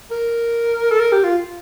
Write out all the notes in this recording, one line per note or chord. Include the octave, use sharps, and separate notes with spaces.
A#4
A4
A#4
G4
F4